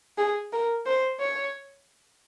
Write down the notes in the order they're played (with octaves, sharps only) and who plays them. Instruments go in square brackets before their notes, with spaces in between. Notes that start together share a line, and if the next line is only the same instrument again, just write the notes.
[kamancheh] G#4
A#4
C5
C#5